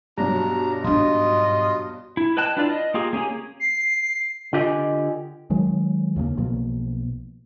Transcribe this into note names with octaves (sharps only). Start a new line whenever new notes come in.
G2 B2 F#3 D4 A#5
G#2 D4 F4 D#5
E4
B4 D#5 G5 A5 F#6
D4 E4 F4 B4 D5
D#5
A#3 F4 G4 G#4
A#3 C#4 G4 G#4
C7
D3 F4 G4 D#5 G#5
D#3 F#3 G#3
D#2 C#3 A3 A#3
B1 B2 F3 A#3